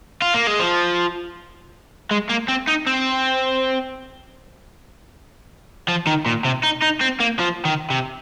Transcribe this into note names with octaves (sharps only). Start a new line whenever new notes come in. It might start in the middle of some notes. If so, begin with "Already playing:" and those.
F4
A#3
G#3
F3
G#3
A#3
C4
D#4
C4
F3
D#3
A#2
C3
D#4
D#4
C4
A#3
F3
D#3
C3